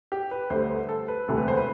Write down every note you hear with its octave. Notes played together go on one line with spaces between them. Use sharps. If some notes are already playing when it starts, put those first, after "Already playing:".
G4
B4
D2 D3 G3 C5
A4
B4
E1 D2 C3 E3 G3 A4
B4
C5
B4